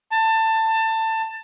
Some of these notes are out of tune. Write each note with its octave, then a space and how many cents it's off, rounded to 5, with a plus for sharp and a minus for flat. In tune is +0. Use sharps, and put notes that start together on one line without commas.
A5 +20